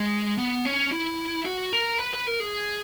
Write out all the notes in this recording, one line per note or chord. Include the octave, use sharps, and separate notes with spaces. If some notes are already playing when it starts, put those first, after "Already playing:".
Already playing: G#3
B3
C#4
E4
F#4
A#4
B4
B4
A#4
G#4